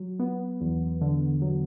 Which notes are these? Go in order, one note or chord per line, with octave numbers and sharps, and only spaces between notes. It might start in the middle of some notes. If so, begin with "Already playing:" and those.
Already playing: F#3
B3
E2
D3
F#3